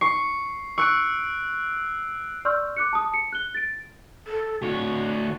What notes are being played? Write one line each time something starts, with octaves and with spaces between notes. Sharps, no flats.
C#6 C7
C#6 E6 F#6 D7
D5 C6 C#6 E6 F6 G6
D6 F#6 C#7
A5 D#6
C#7
F#6 G7
A6 D7
A4
D2 F#4 C#5